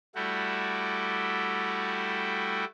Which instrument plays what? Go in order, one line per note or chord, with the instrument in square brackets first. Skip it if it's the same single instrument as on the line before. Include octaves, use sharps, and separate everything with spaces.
[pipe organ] G3 A3 E4 F#4 G4